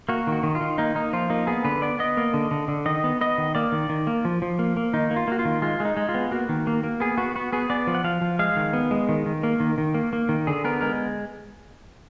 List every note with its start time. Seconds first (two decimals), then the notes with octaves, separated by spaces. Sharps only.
0.09 A#3 F#4
0.27 D#3
0.32 F#4
0.43 D#3
0.55 F4
0.61 D#3
0.78 A#3 D#4
0.95 A#3 D#4
1.13 F3 F4
1.30 A#3 D#4
1.47 B3 G#4
1.65 D3 B4
1.82 B3 D5
1.99 B3 D#5
2.17 A#3
2.34 D3
2.51 D3
2.68 D3
2.86 D#3 D#5
3.04 B3
3.21 B3 D#5
3.38 D#3
3.55 A#3 D5
3.72 D#3
3.89 D#3
4.07 A#3
4.25 F3
4.42 F3
4.59 A#3
4.77 A#3
4.93 D#3 D#4
5.11 A#3
5.16 F4
5.28 A#3 F#4
5.39 F4
5.45 D#3
5.62 G#3 F4
5.80 G#3 D#4
5.97 G#3
6.09 F4
6.14 B3
6.31 A#3 F#4
6.49 D#3
6.67 A#3
6.84 A#3
7.00 B3 G#4
7.18 B3 F#4
7.36 B3 F#4
7.53 B3 G#4
7.70 B3 D5
7.87 F3
7.95 F#5
8.04 F3 F5
8.21 F3
8.39 G#3 F5
8.56 D#3
8.73 B3
8.91 G#3
9.09 D#3
9.26 D#3
9.43 A#3
9.60 D#3
9.78 D#3
9.94 A#3
10.13 A#3
10.29 D#3
10.47 D3 G#4
10.65 B3 A#4
10.81 G#3 A#4